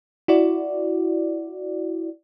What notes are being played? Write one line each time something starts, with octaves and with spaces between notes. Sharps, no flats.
E4 F#4 D5